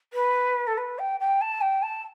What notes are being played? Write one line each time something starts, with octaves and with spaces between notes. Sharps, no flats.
B4
A4
B4
G5
G5
A5
G5
A5